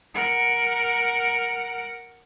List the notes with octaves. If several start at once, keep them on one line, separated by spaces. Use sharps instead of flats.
A#4 F#5